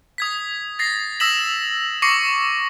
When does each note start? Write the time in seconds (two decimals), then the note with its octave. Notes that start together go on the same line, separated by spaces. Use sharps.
0.18 D#6 G#6 B6
0.79 A6 A#6 C7
1.20 D#6 E6 A#6 B6 E7 F#7
2.02 C#6 D6 A#6 C7 C#7 F#7